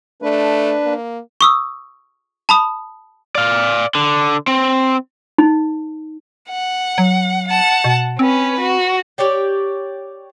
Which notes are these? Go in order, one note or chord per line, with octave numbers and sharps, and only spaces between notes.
A3 D4 B4
A#3
C#6 D#6 E6
A5 B5 D#6
D5 F5
D3
C4
D#4
F#5
F#3
F#5 A5
B2
C4 C#4 B4
F#4
G4 C#5 D5 G5